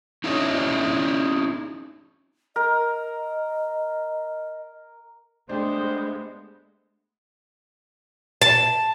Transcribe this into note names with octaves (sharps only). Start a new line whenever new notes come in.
C#4 D#4 E4 G#4 C#5 D#5
A#4 D#5
G#3 A3 B3 D4 G4 C5
A5